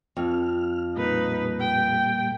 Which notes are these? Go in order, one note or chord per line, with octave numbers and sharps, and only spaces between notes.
F2 F6
A#2 G3 A#3 D#4 B4
G5